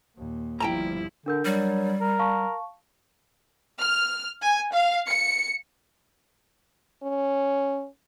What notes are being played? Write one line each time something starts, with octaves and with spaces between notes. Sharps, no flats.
D#2 A#2
G1 F3 G3 E4 G5 A5 A#5
D3 D4 A#4 G6
F#3 G3
A#4
F5 A5 C#6
F6
G#5
F5
C#7
C#4